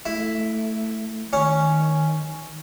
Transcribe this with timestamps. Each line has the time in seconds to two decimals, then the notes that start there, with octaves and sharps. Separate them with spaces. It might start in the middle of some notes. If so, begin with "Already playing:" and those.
0.06 A3 E4
1.33 D#3 C#4